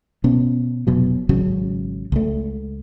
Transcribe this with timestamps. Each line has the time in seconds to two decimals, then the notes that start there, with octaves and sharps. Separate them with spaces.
0.24 B2 B3 C#4
0.87 F1 B2 F#3
1.29 G#1 C#3 F#3 C#4
2.12 C#2 A3